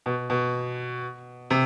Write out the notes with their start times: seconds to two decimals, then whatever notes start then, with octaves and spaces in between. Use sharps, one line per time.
0.06 B2
0.30 B2
1.50 C3